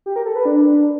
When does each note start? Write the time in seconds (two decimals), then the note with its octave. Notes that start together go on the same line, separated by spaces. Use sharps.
0.06 G4
0.16 A#4
0.26 A4
0.35 B4
0.45 D4